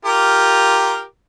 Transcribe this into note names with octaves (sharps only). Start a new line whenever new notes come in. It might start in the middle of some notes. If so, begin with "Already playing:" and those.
F4 G4 A#4